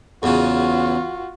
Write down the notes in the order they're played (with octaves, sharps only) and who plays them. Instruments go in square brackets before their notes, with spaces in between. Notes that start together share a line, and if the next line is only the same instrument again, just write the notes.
[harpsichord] E2 C#3 [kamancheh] F4 F#4